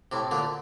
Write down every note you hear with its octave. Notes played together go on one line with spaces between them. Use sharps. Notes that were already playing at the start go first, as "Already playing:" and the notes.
A2 C3
A#2 D3